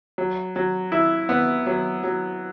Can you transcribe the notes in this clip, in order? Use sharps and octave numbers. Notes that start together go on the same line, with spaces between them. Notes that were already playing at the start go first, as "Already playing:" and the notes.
F#3
F#3
E4
B3
F#3
F#3